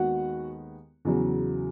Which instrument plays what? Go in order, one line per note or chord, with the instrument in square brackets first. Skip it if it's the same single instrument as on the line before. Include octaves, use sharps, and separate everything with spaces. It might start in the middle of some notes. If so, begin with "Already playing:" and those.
Already playing: [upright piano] D#2 D#3 G#3 B3 F#4 F#5
E2 C#3 F#3